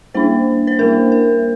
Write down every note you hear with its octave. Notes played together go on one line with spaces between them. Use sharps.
G3 A#3 D4 C5
C5
G3 A#3 D4 A#4
A#4